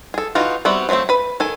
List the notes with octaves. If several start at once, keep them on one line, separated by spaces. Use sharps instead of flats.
G#4 A4
E3 D#4 F4 F#4
G3 B3 C4 F#4 E5
F3 F#3 G#3 A3 C4
B4 B5
D#3 A4 G#5